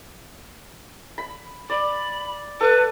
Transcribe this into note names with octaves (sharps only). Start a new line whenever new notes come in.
B5
D5 B5
A4 B4